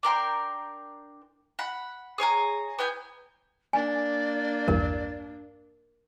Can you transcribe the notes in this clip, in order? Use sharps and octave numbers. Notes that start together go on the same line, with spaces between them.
D4 A#4 G5 C6
F#5 B5
G#4 C#5 G#5 A#5
B3 G5 G#5 G6
A#3 D4 D5 G#5
A#1 E2 G2 A#4